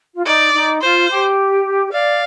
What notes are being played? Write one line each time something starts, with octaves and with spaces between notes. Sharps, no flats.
F4
D#4 D5
D#4
F4 C5
G4
D5 F5